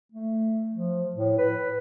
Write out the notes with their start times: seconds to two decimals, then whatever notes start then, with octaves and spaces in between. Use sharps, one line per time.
0.12 A3
0.72 F3
1.16 A2
1.38 B4